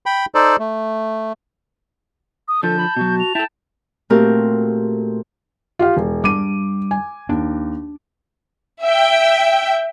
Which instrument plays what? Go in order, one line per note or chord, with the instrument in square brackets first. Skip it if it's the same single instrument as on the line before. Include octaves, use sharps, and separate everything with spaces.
[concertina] G5 B5
D#4 A4 C5 D5
A3
[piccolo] D#6
[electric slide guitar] D3 F3 [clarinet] A4 [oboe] A5 [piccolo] G6
[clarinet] B5
[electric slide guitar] B2 F#3 [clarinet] F#4
[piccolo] F7
[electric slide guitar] E4 A4 [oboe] G5 [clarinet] A5
[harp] A#2 A3 C4 F#4 G4 A#4
[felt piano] F4 G4 F5
E1
[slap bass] G3 D4 [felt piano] D6 D#7
[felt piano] G#5
[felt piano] D#2 [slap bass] D4
[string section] E5 G5